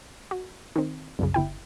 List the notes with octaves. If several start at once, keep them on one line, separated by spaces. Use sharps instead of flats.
F#4
D#3 C4
C2 F#2 C#3
G1 E4 G5